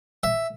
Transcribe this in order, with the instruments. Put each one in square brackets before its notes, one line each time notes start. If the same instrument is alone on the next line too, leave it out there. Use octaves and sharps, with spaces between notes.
[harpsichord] E5